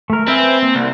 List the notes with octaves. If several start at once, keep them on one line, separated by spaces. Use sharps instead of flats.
A3 A#4
C4 B4 E5 G#5
A#3
C2